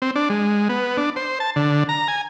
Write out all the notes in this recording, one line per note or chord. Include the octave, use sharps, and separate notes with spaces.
C4
D4
G#3
B3
D4
C5
A5
D3
A#5
G#5